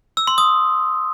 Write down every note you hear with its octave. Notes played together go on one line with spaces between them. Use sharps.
E6
C6
D#6